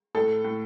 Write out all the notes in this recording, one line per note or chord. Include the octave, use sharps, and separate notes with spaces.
A2 A4
A2